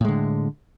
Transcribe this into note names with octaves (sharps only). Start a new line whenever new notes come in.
A2 D3 G#3